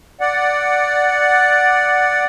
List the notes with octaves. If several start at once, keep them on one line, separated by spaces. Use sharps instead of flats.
D5 F#5